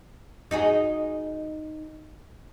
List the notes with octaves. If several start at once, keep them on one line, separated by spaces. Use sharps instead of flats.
D#4 F#4 G#4